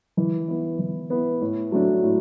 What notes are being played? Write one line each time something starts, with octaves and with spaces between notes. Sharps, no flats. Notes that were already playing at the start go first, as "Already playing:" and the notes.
E3
B3 E4
E3
B3 E4
A2
F#3 A3 D4
A2